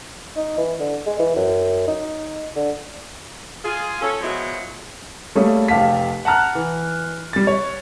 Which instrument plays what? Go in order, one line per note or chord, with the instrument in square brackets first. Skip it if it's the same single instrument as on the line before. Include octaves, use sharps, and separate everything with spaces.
[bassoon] D#4
E3
D3
G#3
E3
F#2
D#4
D3
[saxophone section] F4 G#4
C#4 A4
B2 F3 F#3 G#3 E4 F#4
[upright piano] G3 A3 A#3 C#4 G#4 A4
F1 G4 F5 A5 B6
F#5 A5 A#5 F6 F#6
E3
G3 A6
C#5